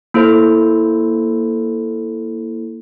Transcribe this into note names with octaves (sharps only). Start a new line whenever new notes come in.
A#3 E4 A4 C5